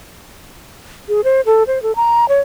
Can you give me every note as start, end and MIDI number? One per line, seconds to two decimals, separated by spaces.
1.09 1.21 68
1.24 1.41 72
1.46 1.63 69
1.67 1.81 72
1.83 1.95 69
1.96 2.28 82
2.29 2.41 73